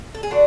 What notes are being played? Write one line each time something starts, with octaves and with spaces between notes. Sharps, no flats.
A4
G#4
D3 D4 F#4